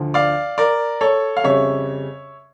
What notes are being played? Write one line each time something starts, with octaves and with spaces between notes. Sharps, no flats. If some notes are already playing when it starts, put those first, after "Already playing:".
Already playing: D2 D3 F3
D5 F5
A#4 D5
A4 C#5
F5
F2 C#3 G3 C#5 E5